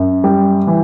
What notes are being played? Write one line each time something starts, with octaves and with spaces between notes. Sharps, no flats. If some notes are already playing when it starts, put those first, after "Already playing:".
Already playing: F#2
G3
E3